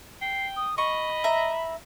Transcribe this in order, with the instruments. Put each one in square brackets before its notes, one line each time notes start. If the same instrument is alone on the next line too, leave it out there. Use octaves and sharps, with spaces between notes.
[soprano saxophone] G5 [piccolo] C7
[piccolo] D#6
[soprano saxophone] D#5 [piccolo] B5 [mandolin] C#6
[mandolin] E5 A#5